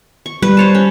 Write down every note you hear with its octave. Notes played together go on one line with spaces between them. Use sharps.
C#6
G3 B4
C5 C#5 A5
C#4